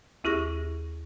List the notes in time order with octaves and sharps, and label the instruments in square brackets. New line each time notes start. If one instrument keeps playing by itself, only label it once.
[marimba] D#2 E4 G4 G#4 C#6 A#6